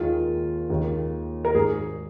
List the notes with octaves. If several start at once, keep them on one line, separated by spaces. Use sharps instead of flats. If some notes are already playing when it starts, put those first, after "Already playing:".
Already playing: D#2 D#3 G#3 F4
D#2 D#3 G#3
A#4
G#1 G#2 G#3 G#4